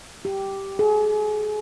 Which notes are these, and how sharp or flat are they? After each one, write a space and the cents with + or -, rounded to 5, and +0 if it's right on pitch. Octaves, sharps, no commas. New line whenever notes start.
G4 -5
G#4 +35